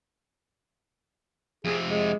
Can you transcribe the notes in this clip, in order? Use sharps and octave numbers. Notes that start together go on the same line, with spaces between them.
F2 C3 G#4
G#3